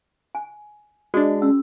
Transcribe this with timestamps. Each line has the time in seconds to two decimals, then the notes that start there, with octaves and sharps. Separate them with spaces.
0.35 G#5
1.14 G#3 D4 F#4 G#4
1.42 C#4 E6